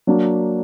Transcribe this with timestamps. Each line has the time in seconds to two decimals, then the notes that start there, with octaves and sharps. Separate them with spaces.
0.07 F#3 A#3 D4